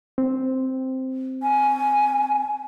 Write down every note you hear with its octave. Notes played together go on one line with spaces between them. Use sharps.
C4
G#5